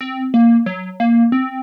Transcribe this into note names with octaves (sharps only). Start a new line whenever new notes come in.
C4
A#3
F#3
A#3
C4